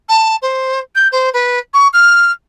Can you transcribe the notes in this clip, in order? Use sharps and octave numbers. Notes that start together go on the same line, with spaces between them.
A5
C5
G6
C5
B4
C#6
F6